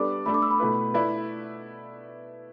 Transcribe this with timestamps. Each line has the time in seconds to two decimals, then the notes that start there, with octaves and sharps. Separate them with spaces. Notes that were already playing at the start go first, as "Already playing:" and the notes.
Already playing: G3 B3 D4 A4 D5 D6
0.26 A3 D4 A4 B5
0.34 D6
0.42 E6
0.51 B5
0.60 B2 A3 E4 B4
0.94 A3 E4 B4 D5